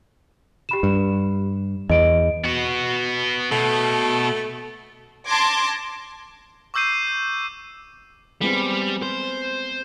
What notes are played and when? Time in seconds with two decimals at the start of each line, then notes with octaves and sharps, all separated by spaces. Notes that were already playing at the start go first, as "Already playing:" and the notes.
0.69 G4 B5 E7
0.83 G2
1.90 E2 D#5 D7
2.44 B3 F#4
3.51 B2 A3
5.27 A5 C6 D6 G#6 A#6
6.74 C#6 D6 E6 G6 C7 D#7
8.41 G3 G#3 B3 C4
9.02 C5